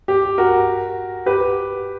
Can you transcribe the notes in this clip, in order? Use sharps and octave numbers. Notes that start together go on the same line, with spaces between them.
G4
F#4 A#4
G4 B4